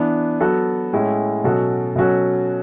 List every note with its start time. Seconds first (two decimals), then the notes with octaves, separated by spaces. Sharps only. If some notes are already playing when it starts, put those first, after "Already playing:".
Already playing: E3 B3 D4
0.41 F#3 B3 F#4 A4
0.93 A2 G#3 C#4 E4
1.44 B2 F#3 C#4 F#4 A4
1.96 B2 F#3 C#4 F#4 A4